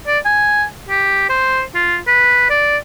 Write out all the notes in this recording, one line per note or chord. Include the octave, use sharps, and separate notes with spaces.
D5
G#5
G4
C5
F4
B4
D5